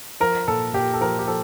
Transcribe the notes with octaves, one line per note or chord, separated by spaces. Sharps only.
F3 A#4
A#2 A4
A#2 G4
A4
F3 A#4
G4
F3 A4